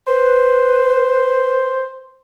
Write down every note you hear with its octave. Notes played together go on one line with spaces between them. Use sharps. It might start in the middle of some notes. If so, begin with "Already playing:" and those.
B4 C5